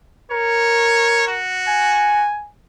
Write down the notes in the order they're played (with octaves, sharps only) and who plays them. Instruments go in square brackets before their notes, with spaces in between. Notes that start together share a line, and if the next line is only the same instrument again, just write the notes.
[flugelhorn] A#4 [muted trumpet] C#5
[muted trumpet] F#4
[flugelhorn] G#5